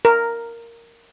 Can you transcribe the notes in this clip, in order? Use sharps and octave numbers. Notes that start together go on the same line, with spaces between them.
A#4